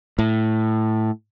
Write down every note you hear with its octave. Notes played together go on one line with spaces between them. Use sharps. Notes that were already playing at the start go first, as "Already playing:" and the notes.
A2